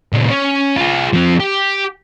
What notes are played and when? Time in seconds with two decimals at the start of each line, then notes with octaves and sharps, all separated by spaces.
0.13 A#2 C#3
0.30 C#4
0.76 F4 G#4
1.13 F3 C4
1.40 G4